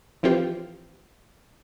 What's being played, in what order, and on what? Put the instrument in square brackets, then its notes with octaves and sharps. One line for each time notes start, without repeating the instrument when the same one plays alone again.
[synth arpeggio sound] E3 F3 C4 F4 G4 C5